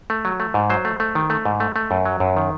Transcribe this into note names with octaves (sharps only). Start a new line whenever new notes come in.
A3
F#3
A3
G#2
F#3 C5
A3
A3
D#3
A3
G#2
A3
A3
F#2
F#3
F#2
D#3